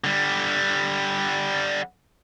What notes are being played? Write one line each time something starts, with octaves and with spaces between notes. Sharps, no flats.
D3 G3